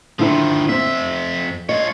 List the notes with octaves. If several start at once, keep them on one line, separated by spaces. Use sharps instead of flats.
D3 D#3 F3 E4 C5
F2 C4 E5
F4 C#5 D#5